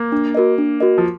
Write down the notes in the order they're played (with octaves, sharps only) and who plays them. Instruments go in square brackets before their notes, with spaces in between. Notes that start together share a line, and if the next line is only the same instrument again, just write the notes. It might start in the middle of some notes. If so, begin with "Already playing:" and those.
Already playing: [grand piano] A#3
[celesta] D4
F#4 A#4 D#5
D4
F#4 A#4 D#5
[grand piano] F3